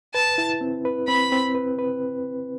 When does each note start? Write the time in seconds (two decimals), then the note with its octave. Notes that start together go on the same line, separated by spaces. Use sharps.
0.14 B4 A5
0.38 E4
0.61 C4
0.85 B4
1.08 C4 B5
1.32 C4
1.55 B4
1.79 B4